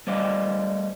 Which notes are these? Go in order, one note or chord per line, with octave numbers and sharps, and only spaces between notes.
G3 A3 C5 D5 D#5 F5